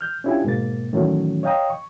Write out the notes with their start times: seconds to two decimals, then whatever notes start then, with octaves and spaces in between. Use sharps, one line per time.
0.01 F6 G6
0.24 C#4 D4 E4 F4 G4 G#5
0.44 G#2 B2 A#3 A6
0.93 A2 D#3 E3 F#3 A3 C#4
1.43 C#5 D#5 F5 G5 A#5 D#6
1.70 C#6